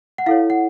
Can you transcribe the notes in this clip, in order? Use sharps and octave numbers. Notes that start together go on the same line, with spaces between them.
F#5
E4 A4 C#5 F5
F#5